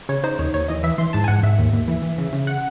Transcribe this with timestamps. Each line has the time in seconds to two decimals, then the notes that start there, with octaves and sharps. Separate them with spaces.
0.09 C#3 C#5
0.24 D#4 C5
0.39 D#2 C#5
0.54 D#2 C#5
0.68 E3 D#5
0.83 E3 E5
0.98 E3 C6
1.13 G#2 A5
1.24 G#5
1.28 G#2 F#5
1.43 G#2 E5
1.58 D#2
1.73 D#2
1.88 E3
2.02 E3
2.18 C#3
2.33 C#3
2.47 F#5